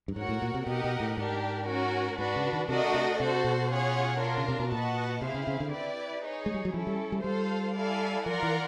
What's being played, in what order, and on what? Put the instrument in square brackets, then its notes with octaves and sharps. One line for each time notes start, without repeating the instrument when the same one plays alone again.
[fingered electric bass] G2
[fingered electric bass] G#2 [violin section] F#4 A#4 C#5 F#5
[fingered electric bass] A2
A#2
C3
[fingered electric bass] B2 [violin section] D#4 G4 A#4 D#5 F#5
[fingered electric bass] B2
A2
[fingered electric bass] G#2 [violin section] D4 G4 A#4
[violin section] C#4 F#4 A#4
[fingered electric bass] G#2 [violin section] D4 F#4 B4
[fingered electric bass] C#3
D#3
[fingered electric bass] C3 [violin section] A3 D4 F#4 A#4 D#5
[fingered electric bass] C3
[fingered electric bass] C3 [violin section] F#4 A4 C5
[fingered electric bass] B2
[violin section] C#4 F4 G#4 C#5 F#5
D4 F4 A#4
[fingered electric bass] C#3
C3
B2
[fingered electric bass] A#2 [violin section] F#4 B4 D#5 F#5 A5
[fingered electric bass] C3 [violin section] C4 E4 G#4 C5 F5
[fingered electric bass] C#3
C#3
D3
[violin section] E4 G4 B4 D5
D#4 G#4 C#5
[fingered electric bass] G#3
G3
F#3
[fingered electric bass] F3 [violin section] C#4 E4 A4
[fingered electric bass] G3
G3
[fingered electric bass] G3 [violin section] F4 A4 C5 F5
[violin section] E4 A4 D5 F5 G#5
[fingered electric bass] F3 [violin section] F4 A#4 D5 F#5
[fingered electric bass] E3